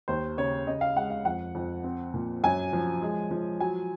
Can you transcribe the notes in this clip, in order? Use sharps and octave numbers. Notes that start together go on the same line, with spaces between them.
D#2 C5
C#3 C#5
C#3 D#5
F5
G#3 F#5
F5
F2 F#5
F2
C4
A#2
F#2 G#5
F3
G#3
F3
F#3 G#5